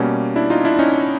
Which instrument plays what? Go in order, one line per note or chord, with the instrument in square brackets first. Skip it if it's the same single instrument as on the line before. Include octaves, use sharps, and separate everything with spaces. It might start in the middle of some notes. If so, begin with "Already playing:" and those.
Already playing: [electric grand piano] B2 G3 A#3 C#4
D4 E4
D#4 F4
D4 E4
C#4 D#4